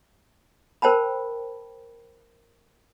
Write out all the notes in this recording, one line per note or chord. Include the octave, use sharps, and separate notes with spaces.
A#4 C5 G5 A5 B5